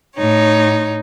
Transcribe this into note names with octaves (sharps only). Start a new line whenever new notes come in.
A2 D#4 C#5